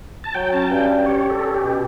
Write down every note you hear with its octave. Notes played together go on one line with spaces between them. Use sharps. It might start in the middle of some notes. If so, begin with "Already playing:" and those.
A5
F#3 G5
C#4 A5
G2 G5
C#4
G4 C#5
G4
A4
C#4
G4
B2